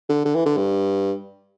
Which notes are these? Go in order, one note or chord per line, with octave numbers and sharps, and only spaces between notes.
D3
D3
E3
D3
G2